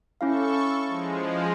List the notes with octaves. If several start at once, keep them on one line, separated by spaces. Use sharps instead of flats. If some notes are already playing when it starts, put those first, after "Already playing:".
C#4 E4 A4 F5 C#6
F3 G#3